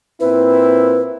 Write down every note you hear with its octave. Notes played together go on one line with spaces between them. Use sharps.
A#2 C4 E4 B4